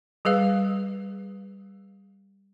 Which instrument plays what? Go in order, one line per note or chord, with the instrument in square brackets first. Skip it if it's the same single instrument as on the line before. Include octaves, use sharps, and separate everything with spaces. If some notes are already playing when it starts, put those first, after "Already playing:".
[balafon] G3 G#4 B4 F5